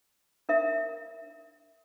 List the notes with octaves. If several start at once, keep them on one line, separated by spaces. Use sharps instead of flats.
D4 A#4 E5